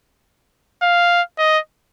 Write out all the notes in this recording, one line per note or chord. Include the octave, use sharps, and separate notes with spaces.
F5
D#5